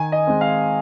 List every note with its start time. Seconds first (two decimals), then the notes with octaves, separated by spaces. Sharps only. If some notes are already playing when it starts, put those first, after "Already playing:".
Already playing: D#3 G#5
0.12 D#5
0.27 G#3 C4
0.41 F5